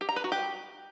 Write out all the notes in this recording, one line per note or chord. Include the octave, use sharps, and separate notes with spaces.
G4
A#5
B4
F#4
G4